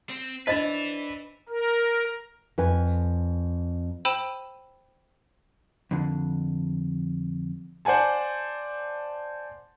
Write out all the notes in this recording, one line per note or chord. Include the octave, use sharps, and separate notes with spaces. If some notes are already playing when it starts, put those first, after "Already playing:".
C4
D4 B4 C5 D#5 E5 A6 B6
A#4
F2 B4 G#5
C5 G5 B5 E6 D#7 E7
F2 D3
C5 D5 F#5 G#5 A5